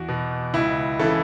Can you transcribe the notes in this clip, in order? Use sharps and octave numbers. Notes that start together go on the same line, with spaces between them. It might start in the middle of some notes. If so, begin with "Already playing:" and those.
Already playing: E2 F#4
B2
C#2 E4
C#3 E3 A4